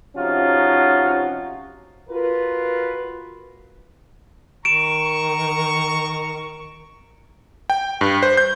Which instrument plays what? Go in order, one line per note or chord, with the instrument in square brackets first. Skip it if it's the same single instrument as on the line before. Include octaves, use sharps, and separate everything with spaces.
[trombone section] C3 F3 C#4 D#4 F4 F#4
[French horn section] F4 F#4 A#4 B4
[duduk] D#3 [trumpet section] A#5 C#6 [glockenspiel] D7 E7
[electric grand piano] G5
G2
C5
G6